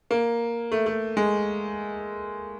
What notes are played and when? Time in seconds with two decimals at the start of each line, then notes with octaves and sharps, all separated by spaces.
0.11 A#3
0.72 A3
0.86 A3
1.17 G#3